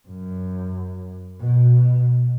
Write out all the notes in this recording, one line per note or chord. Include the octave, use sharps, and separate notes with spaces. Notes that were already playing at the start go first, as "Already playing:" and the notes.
F#2
B2